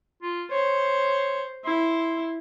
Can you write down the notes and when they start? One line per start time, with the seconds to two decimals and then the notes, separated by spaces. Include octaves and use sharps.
0.22 F4
0.51 C5 C#5
1.65 E4 C6